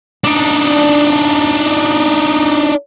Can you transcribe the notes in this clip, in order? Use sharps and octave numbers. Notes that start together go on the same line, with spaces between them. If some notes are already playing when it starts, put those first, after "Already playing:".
D4 D#4